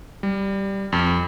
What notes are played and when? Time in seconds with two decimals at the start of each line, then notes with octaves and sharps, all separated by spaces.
0.23 G3
0.92 F2